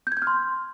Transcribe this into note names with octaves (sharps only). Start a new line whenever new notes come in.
G6
G#6
G6
F6
C6